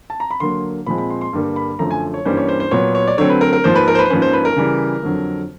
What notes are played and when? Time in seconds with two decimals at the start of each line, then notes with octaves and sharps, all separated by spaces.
0.10 A5
0.20 A#5
0.31 B5
0.40 D3 F#3 A#3 C6
0.86 A#2 F3 G#3 C4 B5
0.98 B5
1.10 C6
1.21 C6
1.33 G2 D3 G3 A#3
1.56 B5
1.79 F#2 D3 F3 A3 A#5
1.91 G#5
2.14 C#5
2.25 G2 E3 G3 A#3 C#4 C5
2.37 C#5
2.49 C5
2.60 C5
2.71 A#2 F#3 B3 C#5
2.95 C#5
3.07 D5
3.18 D3 F#3 A3 C4 C#5
3.30 B4
3.41 A#4
3.53 A#4
3.64 G#2 F3 A#3 C5
3.75 B4
3.88 A#4
3.95 C5
3.99 B4
4.05 C5
4.10 G#2 F3 A#3 C#4 B4
4.22 C5
4.33 B4
4.45 A#4
4.56 C#3 E3 G3
5.03 F2 D3 F#3